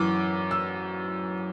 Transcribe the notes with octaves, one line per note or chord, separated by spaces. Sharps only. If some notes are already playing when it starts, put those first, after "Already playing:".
Already playing: F#2 E3 D6
E6